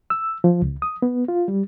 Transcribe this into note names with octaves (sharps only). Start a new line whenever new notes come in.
E6
F3
C#2
D#6
B3
F4
G3